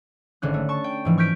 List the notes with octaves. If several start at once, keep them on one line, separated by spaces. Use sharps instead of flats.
G#1 D3 C#4 F#6
A3
A5 C#6
G5
G#2 E3 F3
C#6 F6 G6 B6 D7